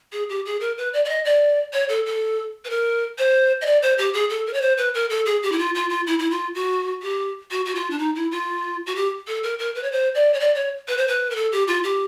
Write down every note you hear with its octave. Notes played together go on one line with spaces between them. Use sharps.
G#4
G4
G#4
A#4
B4
D5
D5
D#5
D5
C#5
A4
A4
B4
A#4
C5
D#5
D5
C5
G4
G#4
A4
A#4
C#5
C5
B4
A#4
A4
G#4
G4
E4
F4
F4
F4
E4
E4
F4
F#4
G4
F#4
F#4
F4
D4
D#4
E4
F4
F#4
G4
A4
A#4
A#4
B4
C#5
C5
D5
C#5
D5
C#5
B4
C5
B4
A#4
A4
G4
F4
G4